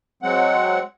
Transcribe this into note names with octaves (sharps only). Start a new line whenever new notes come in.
F#3 G#3 C4 F#5